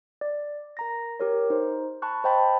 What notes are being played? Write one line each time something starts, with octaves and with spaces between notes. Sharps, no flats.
D5
A#4 A#5 A#6
G4 A#4 C#5
D#4 C5
A5 B5 C#6 F#6
C5 D#5 G5 A5 B5